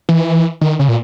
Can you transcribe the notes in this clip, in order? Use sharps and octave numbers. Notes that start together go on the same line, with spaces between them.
E3
D#3
C#3
A#2